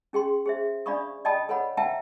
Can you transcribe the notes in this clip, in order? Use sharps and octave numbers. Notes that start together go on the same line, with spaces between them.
C#4 G#4 G5 C6
G#4 C5 E5
D4 D5 F5 B5 C#6 D#6
D5 D#5 G5 A5 B5 D#6
A4 B4 C#5 F#5 B5
B4 E5 F#5 G5 A5 A#5